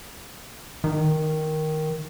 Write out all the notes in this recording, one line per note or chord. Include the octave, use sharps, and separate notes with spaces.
D#3